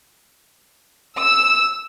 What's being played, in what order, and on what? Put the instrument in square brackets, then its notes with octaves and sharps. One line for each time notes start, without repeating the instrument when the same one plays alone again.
[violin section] E6